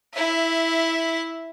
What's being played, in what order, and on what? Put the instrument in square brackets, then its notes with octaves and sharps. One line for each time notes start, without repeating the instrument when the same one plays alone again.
[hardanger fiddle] E4 E5